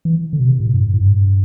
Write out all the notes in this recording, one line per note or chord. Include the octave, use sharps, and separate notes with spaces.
E3
D3
B2
C3
A2
G2
A2
G2